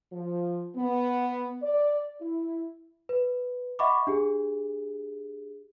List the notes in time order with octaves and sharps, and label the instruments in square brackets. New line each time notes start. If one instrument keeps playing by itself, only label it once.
[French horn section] F3
B3
D5
E4
[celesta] B4
D#5 E5 F#5 B5 C#6 D6
D4 G4 G#4